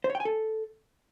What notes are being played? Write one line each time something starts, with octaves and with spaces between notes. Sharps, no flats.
C5
C#5
G5
G#5
A4